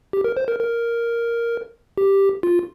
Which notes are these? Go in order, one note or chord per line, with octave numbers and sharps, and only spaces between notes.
G4
A#4
C5
A#4
A#4
G4
F4